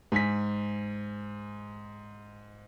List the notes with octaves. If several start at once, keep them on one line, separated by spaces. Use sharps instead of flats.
G#2 G#5 B6